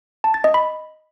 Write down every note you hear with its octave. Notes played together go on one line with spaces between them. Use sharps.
A5
A6
D#5
B5